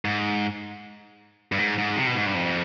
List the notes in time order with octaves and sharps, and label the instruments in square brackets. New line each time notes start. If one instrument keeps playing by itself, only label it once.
[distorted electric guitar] G#2
G2
G#2
G#2
C3
B2
G#2
G2
F2